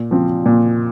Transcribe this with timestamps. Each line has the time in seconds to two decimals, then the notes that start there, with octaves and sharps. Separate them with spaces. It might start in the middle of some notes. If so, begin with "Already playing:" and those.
Already playing: A#2
0.11 F3 C4
0.46 A#2